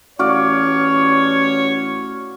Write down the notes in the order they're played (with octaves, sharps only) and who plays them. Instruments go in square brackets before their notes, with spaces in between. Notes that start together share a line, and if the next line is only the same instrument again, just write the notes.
[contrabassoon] A1 [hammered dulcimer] F#4 D5 F5 [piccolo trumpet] C#5